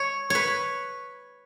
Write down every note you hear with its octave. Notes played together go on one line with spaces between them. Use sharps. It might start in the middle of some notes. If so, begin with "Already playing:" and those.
Already playing: C#5
B4 C#5